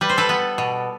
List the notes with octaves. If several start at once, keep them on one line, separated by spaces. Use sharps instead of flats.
G3 B4
C5
A4 B4
B3
B2